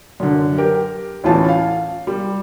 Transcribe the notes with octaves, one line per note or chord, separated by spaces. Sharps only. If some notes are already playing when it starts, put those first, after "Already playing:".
F#2 D3
G4 A#4
D2 A2 E3 C#4 F4 A5
F5
G3